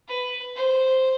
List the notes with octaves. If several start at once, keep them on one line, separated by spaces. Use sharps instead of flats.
B4
C5